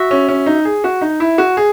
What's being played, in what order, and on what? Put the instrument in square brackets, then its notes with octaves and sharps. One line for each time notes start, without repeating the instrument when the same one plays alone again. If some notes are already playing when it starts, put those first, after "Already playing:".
Already playing: [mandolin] F#4 E5
[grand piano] C#4
C#4
D#4
G#4
F#4
D#4
E4
F#4
G#4